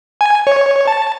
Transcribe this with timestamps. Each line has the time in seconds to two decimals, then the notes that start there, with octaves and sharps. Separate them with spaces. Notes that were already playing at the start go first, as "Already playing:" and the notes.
0.21 G#5
0.47 C#5
0.87 A5